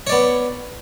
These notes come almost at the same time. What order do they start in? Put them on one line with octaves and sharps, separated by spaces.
C#5 D5 B3